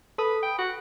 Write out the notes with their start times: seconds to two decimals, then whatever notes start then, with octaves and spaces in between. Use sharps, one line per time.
0.18 A4 B4 B5 D#6
0.43 G5
0.58 F#4